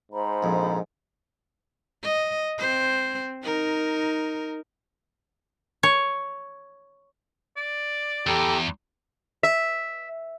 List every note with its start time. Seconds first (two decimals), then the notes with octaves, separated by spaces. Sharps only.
0.12 G#2 C5 A#5 B5
0.43 A#1 F2
2.03 D#5
2.58 C4 C5
3.43 D#4 A#4
5.83 C#5
7.57 D5
8.27 E2 G4 A4 A#5
9.43 E5